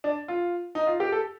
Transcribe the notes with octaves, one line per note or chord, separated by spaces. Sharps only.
D4
F4
D#4
F4
G4
A4